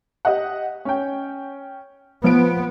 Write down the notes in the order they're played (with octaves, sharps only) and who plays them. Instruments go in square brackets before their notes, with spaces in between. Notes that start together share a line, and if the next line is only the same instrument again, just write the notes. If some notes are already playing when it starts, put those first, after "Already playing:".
[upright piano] G4 D#5 F#5
C#4 G5
[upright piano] F3 D7 [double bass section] B3